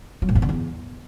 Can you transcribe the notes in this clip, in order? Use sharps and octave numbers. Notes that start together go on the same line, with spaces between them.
F#3
A2
G2
D3
E2